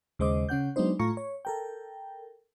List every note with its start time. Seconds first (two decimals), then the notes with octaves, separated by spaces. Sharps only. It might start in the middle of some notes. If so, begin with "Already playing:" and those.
0.19 D#2 C#3 G#3 C5 D#5 D6
0.49 C#3 C#4 F#5 G6
0.76 F#3 G#3 B3 D4 D#4 C5
0.99 A2 A3 F4 A#5 C#6 C#7
1.17 C#5
1.45 A4 A#4 G5